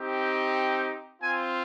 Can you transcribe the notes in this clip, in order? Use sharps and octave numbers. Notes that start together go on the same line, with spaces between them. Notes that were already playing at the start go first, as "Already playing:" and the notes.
Already playing: C4 D#4 G4
G5
C4 F4 G#5